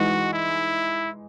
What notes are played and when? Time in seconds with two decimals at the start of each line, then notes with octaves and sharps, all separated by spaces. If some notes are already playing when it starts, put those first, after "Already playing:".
Already playing: E3 G#3 D#4 F#4
0.33 E4